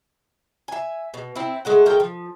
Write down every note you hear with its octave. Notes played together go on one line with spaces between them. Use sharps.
E5 G#5
B2
C4 E4
G#3 A3 F#5
G#3 A3 A#4 G5
F3